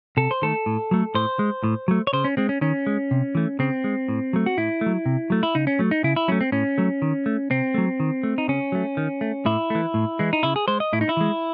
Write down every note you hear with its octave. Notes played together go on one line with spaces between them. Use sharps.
C3 A4
C5
D#3 A3 A4
A2
F#3 A3
A2 C5
G#3
A2
F#3 A3
C#5
C#3 C5
C#4
G#3 C4
C#4
D#3 C#4
G#3
C3
E3 A3
C#3 C4
G#3
A2
F#3 A3
F#4
A2 E4
A3
F#3
C3
F#3 A3
E4
C#3 D#4
C#4
F#3 A3
D#4
C#3 E4
E4
F#3 A3 C#4
C4
A2 C#4
F#3 A3
D#3
A3
C3 C4
F#3 A3
D#3
A3
D#4
C#3 C#4
F#3 A3
D#3
A3
A2 E4
E3 A3
A2
E3 G#3
D#4
C#3 E4
G#4
G#3 C5
D#5
A2 E4
D#4
E4
E3 G#3